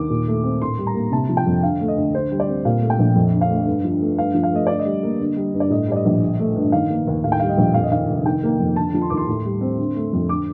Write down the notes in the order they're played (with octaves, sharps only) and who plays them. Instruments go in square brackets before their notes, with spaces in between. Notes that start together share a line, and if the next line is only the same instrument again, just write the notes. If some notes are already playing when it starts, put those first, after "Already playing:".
Already playing: [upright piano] D#2 D6
A#2
A3
C4
A2 C6
G3
A#5
A#3
C3 A5
F3
G5
F2
D3 F5
A3
D#5
D2
D3 C5
G3
D5
C4
A#2 F5
A3
G5
A#1
F2
D3
F5
A3
G2
F3
A3
G2 F5
F3
F5
A3 D#5
D3 D5
D#5
G3
A#3
D3
G3
G2
D5
A2 D#5
G3 D5
D#5
A#1
D3
A3
G2
D#3 F5
A#3
D#2
A2 F5
G5
G3 F5
D#5
A#1
F2 F5
D#5
D#3 F5
F1
D#3 G5
A#3
F2
D3 A5
F3
C6
D#2 D6
C6
A2
G3
C4
D3
A3
F2
D3 D6